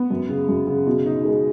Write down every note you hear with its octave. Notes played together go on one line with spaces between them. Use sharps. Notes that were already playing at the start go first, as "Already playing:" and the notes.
Already playing: B3
F#2
C#3
F#2
C#3
B2
D#4
G#3